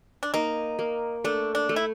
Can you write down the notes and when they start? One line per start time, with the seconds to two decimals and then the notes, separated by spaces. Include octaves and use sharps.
0.23 D4
0.34 A#3 D#4
0.79 A#3
1.24 A3 D4
1.55 D4
1.69 A3
1.76 E4